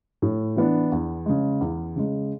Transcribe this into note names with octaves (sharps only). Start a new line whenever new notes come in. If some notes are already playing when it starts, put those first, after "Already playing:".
A2
E3 B3 D4
E2
C#3 G#3
E2
C#3 G#3